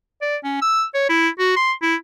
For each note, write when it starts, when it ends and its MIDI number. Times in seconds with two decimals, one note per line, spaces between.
0.21 0.37 74
0.44 0.60 61
0.62 0.83 88
0.94 1.07 73
1.09 1.29 64
1.39 1.54 66
1.56 1.72 84
1.82 1.95 64